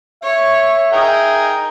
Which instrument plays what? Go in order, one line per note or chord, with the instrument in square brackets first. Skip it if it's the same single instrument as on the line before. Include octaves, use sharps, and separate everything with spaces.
[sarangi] C#5 [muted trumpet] E5
[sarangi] D#4 [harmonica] G#4 A#4 G5